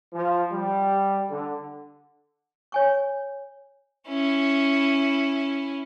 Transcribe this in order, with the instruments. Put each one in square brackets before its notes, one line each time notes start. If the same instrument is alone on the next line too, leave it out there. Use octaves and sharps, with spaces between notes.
[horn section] F3
G3
D3
[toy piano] C#5 G#5 C#6
[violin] C#4 E4